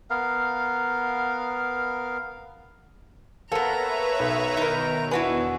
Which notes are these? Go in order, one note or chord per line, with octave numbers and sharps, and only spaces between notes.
B3 A#4 F5
A#3 B3 A4 B4 C#5 E5 A#5
B1
B2 D#3 D#4 A#4
E2 B3 D4 E4 F#4 B4 D#5 G#5